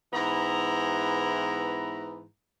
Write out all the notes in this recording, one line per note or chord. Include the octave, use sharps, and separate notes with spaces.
G#2 E3 B3 E4 A#5